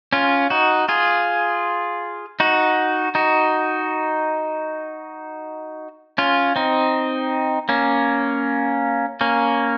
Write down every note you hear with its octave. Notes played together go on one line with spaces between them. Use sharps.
C#4 F4
D#4 F#4
F4 G#4
D#4 F#4
D#4 F#4
C#4 F4
C4 D#4
A#3 C#4
A#3 C#4